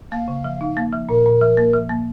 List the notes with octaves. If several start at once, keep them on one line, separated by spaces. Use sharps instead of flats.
A#3 F5
C#3
F3
D#4
A#3
F3
A#2 A#4
A#2
F3
A#3
F3
A#3